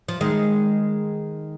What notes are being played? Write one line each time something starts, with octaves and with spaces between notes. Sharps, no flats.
F3
D#3 G#3